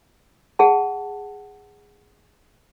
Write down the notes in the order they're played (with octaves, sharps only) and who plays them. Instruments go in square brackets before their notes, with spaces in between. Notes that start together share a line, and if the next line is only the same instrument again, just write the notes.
[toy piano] G#4 F#5 A5